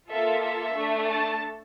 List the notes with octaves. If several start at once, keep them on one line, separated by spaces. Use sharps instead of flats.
A#3 F4 A4 E5
E5
A3 D4 A4
A5